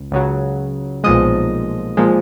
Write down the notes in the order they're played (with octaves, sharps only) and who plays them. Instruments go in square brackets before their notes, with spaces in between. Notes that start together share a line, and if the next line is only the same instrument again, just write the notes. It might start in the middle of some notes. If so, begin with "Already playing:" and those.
Already playing: [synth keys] C#2
C#2 C#3 F#3
B1 A#2 F3 G#3 D#5
A#2 F3 G#3